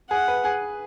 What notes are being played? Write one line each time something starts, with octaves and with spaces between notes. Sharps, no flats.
G#4 F#5
B4
G#4